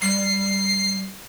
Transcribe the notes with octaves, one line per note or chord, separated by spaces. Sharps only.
G3 C7